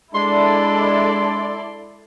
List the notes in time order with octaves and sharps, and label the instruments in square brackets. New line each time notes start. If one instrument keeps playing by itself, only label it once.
[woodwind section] G#3 [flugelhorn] D4 [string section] E4 A4 D5 [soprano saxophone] C6